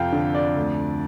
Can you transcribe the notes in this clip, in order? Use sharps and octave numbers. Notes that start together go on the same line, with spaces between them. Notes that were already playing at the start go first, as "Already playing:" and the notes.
Already playing: F2 C3 F5 G5
D3
D5
D2